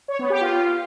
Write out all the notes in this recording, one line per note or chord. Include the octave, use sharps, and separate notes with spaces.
C#5
B3
G4
F4